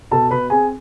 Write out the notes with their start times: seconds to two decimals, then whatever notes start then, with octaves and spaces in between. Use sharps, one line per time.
0.11 B2 A4 A5
0.31 B2 B4 B5
0.50 C4 G#4 G#5